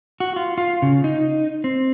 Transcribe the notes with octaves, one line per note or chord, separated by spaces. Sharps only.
F#4
F4
F4
C#3
D#4
C4